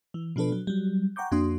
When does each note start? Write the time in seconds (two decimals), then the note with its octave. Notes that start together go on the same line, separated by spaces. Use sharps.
0.14 E3
0.36 B2 F3 D4 A4 B4
0.52 F#3
0.67 F#3 G3
1.16 F#5 G5 A#5 C#6 D6 G6
1.31 F2 A#3 D4 F#4 C6 D#6